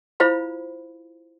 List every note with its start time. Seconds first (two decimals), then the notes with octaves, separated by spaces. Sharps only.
0.20 E4 F4 C5 F5 B5